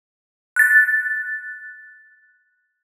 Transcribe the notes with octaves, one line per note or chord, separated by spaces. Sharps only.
F#6 A6